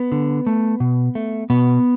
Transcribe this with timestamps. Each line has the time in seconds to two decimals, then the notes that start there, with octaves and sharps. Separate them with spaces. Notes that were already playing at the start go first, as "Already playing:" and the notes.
Already playing: B3
0.12 D3
0.47 A3
0.80 B2
1.15 A3
1.50 B2 B3